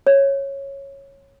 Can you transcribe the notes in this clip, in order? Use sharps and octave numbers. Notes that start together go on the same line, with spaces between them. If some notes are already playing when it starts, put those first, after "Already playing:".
C#5